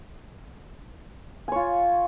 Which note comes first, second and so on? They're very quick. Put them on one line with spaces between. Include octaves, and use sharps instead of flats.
G#5 C#5 F4